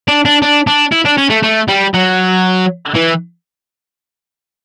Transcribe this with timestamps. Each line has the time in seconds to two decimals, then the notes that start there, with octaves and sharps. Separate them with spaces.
0.08 D4
0.25 D4
0.42 D4
0.67 D4
0.92 E4
1.06 D4
1.18 C#4
1.30 A3
1.43 A3
1.68 G3
1.94 F#3
2.95 E3